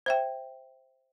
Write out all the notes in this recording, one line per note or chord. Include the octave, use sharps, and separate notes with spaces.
C5 E5 G5